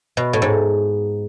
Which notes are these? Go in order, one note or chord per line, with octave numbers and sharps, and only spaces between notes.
B2
A2
G#2